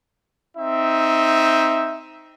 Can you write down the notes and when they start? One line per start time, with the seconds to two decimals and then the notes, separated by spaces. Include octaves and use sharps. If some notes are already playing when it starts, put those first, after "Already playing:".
0.56 C4 D#4 E5